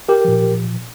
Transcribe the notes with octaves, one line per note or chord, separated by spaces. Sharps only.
G4 A#4
A#2 F3